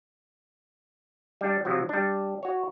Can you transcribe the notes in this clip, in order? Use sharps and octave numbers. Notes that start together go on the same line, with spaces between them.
G3 D4
C3 F3 F#3
G3 D4
F#4 C#5